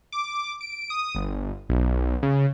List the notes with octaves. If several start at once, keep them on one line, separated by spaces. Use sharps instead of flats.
D6
D7
D#6
G1
B1
C#3